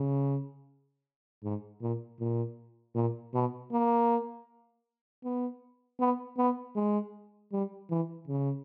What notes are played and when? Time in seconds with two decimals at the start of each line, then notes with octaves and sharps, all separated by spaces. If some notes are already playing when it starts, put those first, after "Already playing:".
Already playing: C#3
1.44 G#2
1.82 A#2
2.20 A#2
2.95 A#2
3.34 B2
3.72 A#3
5.24 B3
6.00 B3
6.38 B3
6.76 G#3
7.52 G3
7.90 E3
8.28 C#3